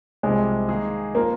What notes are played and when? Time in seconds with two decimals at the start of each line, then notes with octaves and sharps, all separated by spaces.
0.23 C2 C3 F3 G#3 C4
0.69 D#3 A#3 D#4 G#4
1.15 F3 A#3 C4 F4 A#4